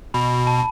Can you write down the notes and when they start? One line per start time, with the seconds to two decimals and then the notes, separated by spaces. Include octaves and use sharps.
0.14 B2 B5
0.47 A5